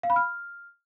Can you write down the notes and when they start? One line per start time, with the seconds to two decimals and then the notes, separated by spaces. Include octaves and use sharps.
0.03 F5
0.10 B5
0.16 F6